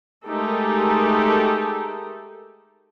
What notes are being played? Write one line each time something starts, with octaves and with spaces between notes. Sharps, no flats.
G#3 A3 D#4 G4 A4 A#4